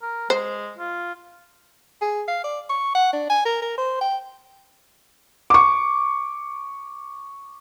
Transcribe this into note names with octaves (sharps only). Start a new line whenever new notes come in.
A#4
G#3 C5
F4
G#4
F5
D5
C#6
F#5
D4
G#5
A#4
A#4
C5
G5
C#6 D6